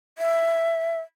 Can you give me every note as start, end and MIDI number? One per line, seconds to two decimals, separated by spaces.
0.18 1.00 76